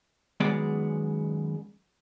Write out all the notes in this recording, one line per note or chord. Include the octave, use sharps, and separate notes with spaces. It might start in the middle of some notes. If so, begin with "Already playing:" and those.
F#2 D#3 G#3 B3 G#4 D5